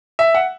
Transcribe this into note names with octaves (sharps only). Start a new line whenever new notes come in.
E5
F#5